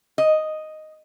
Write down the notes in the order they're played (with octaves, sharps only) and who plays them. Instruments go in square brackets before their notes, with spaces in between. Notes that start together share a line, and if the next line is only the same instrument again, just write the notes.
[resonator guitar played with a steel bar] D#5